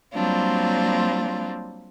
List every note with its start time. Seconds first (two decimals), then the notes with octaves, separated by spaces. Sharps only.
0.14 F#3 G3 A#3 C4 D4 F4